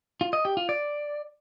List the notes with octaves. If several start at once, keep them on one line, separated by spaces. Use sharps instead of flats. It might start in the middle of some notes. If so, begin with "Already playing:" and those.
F4
D#5
G4
F4
D5